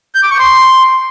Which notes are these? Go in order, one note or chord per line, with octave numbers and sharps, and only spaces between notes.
G6
D6
C#6
C6